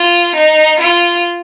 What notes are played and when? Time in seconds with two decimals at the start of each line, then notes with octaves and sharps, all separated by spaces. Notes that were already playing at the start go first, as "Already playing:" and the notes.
Already playing: F4
0.36 D#4
0.80 F4